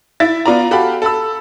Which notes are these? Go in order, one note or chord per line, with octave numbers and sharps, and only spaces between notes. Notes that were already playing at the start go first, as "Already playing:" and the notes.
E4 E5 A6
B3 F4 D5 A#5
F#4 G4 A4 F5 B5
A4 B5 E6